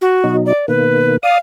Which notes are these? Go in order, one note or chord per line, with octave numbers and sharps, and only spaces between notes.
F#4
B2 F#3 D#4
D5
B2 D#3 A#3 B4
D5 F5 D#6